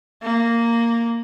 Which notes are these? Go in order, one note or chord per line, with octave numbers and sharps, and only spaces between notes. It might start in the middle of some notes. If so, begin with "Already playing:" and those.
A#3